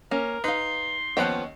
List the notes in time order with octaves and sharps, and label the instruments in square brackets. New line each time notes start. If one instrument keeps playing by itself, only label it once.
[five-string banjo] A#3 C#4 [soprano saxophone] A#4
[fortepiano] D#4 [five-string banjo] B4 F5 [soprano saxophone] C6
[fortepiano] D#2 C#4 F#5 [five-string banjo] F3 B3 G5